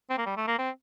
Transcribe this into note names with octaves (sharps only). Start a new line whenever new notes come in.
C4
A#3
G3
A3
A#3
C4